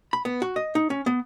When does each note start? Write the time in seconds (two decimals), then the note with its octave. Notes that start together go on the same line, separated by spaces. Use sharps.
0.13 B5
0.25 B3
0.42 F#4
0.56 D#5
0.75 D#4
0.90 C#4
1.06 B3